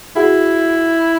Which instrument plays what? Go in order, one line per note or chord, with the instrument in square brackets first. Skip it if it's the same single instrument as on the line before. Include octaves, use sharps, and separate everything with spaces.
[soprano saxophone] E4 [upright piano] F#4 G#4